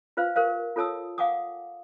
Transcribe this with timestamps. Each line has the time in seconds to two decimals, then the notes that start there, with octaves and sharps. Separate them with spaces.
0.17 F4 B4 C5 F5
0.36 G4 A#4 C5 F5
0.76 F4 A4 C#5 A5 D#6 E6
1.18 F5 F#5 G#5 D6 D#6